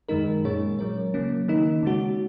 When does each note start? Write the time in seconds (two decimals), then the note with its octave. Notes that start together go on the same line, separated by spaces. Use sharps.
0.09 F#2 D#3 G#3 D#4 A#4
0.44 A#2 G#3 C#4 G#4 C#5
0.79 F#3 C#4 A#4 C#5
1.14 C#3 F#3 A#3 C#4
1.48 D#3 A#3 D#4
1.83 C#3 G#3 C#4 F#4